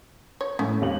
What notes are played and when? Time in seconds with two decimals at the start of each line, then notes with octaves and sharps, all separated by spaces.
0.41 C#5
0.59 A2 C#4
0.81 G#1 D#2 F#7